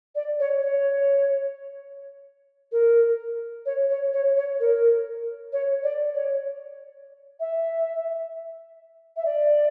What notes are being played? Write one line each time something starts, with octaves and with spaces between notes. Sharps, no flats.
D5
C#5
C#5
A#4
C#5
C#5
C#5
C#5
A#4
C#5
D5
C#5
E5
E5
D5